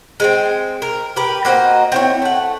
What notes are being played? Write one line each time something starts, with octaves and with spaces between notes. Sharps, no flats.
G#3 B3 C4
A#4
G4 A#4 B4
A#3 F#4 C5 D#5
C4 E4 C#5
A3 F#5